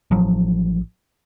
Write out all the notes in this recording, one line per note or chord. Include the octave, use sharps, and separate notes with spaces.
A1 A2 F3 F#3